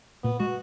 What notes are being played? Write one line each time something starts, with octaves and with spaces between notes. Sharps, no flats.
A#2 A#3 B3
G#3 F#4